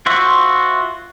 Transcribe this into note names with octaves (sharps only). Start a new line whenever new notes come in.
F4 F#4 C5 E5